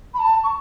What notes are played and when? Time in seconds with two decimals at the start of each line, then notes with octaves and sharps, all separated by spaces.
0.14 B5
0.18 A5
0.43 C#6